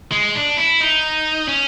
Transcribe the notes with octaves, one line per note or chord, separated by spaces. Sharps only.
G#3
D4
E4
D#4
C#4